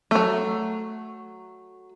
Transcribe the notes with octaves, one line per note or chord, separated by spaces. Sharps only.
F#3 A3